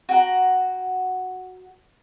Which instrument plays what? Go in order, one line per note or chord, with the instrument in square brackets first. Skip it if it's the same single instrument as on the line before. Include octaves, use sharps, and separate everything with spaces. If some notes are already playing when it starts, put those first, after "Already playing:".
[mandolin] F#4 G5 A#5